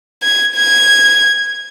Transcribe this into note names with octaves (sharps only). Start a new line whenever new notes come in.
G#6
G#6